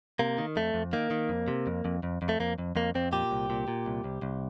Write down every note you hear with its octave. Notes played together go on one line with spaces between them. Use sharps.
C3 A#3
D#3
F2 A3
F2
D#3 A#3
D#3
F2
C3
F2
F2
F2
F2
A3
F2 A#3
F2
F2 A#3
F2 C4
A#2 G4
C2
A#2
A#2
C2
C2
C2